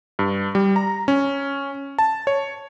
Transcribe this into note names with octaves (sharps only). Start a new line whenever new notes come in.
G2
G3
A#5
C#4
A5
C#5